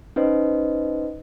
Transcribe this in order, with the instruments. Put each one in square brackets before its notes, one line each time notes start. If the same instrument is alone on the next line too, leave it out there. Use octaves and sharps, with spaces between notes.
[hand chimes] C#4 D#4 B4 C5 D#5